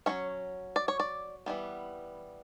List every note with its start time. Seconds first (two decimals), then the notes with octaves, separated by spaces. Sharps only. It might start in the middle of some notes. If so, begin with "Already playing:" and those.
0.06 F#3 A3 C#4 C#5
0.76 D5
0.88 C#5
1.00 D5
1.46 E3 G3 B3